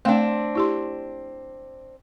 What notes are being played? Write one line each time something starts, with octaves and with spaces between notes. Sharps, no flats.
A3 C4 D4 F5 G5
E4 G4 C6